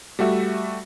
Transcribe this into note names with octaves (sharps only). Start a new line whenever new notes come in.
G3 A3 F#4 E5